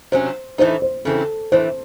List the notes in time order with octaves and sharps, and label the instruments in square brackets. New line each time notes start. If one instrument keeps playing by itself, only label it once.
[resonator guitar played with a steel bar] C3 F#3 C#4 [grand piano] C5
[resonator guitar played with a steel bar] A2 E3 A3 D#4 [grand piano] C5
[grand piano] C5
[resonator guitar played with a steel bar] C#3 E3 C4 [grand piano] A4
[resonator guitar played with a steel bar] A2 E3 A3 [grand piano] C5